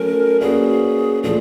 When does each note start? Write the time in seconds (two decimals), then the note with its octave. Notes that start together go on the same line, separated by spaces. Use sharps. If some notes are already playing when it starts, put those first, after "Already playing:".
Already playing: F#3 A3 C#4 A#4
0.41 A#3 C#4 F#4 G#4 B4 D5
1.24 A#2 F3 A3 D4 G#4